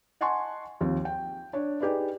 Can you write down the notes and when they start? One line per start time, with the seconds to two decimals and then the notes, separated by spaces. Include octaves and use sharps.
0.21 D#5 F#5 G#5 A5 C6 C#6
0.81 D#2 F3 C4
1.05 G5
1.53 D4 C#5
1.81 D#4 G4 G#4 B4 D5